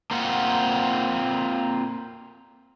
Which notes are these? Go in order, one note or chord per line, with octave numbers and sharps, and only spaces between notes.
A#3 C4 F4 F#5